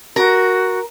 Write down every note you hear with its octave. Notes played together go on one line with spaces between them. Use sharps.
F#4 A#4